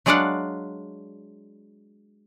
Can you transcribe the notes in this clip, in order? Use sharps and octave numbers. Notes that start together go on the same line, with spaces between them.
F#3 G#3 D4 D5 F5 F#5